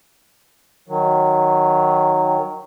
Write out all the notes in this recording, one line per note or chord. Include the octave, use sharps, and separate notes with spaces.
D#3 F#3